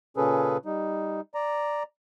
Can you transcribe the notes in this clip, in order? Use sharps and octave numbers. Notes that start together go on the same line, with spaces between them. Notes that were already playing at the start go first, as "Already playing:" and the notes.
A#2 C#3 C#4 G#4 A4 B4
G3 D#4
D5 A#5